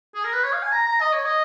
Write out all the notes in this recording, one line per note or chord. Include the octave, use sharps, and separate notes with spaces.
G#4
A#4
B4
C#5
F5
G#5
A#5
A#5
D#5
C#5
D#5